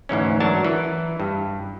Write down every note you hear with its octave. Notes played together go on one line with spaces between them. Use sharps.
D2 G#2 E3 C#4
E3 F#3 D4 A#4 A5
E3
G2